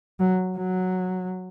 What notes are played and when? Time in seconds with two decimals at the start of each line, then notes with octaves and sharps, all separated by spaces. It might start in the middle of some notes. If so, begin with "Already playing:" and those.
0.20 F#3
0.57 F#3